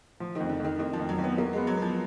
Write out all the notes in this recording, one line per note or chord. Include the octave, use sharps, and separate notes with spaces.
F3
D#3
F2
D3
F2
D#3
F2 D#3
F3
F2
F#3
F2
B3
F#3 A#3
G#3 B3
F#3
F3 B3